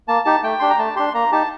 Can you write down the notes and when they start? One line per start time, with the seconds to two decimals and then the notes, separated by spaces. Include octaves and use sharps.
0.08 A#3 A5
0.25 D#4 G4 A5
0.43 A3 G5
0.60 D4 G4 C6
0.69 A#5
0.79 A3 A5
0.96 D4 G4 C6
1.14 A#3 A#5
1.32 D#4 G4 A5